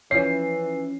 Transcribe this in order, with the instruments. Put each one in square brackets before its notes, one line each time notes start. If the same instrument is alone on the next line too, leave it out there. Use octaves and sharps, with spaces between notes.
[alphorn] E3 [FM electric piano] F3 C#4 [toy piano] C#5 [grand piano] C7